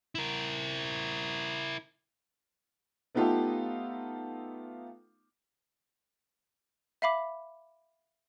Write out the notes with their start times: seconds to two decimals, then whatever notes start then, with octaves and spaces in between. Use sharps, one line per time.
0.15 E4 A#4
3.15 A3 B3 D#4 F4 G4 A4
7.02 E5 F5 B5 D6